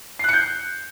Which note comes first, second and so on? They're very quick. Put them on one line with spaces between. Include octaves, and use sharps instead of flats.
C7 F#6 C#7 G6